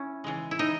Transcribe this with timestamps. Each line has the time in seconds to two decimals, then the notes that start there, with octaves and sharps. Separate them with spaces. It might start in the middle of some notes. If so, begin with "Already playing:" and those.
Already playing: C#4 E4
0.24 C#3 E3 G#3
0.51 E4
0.59 D#4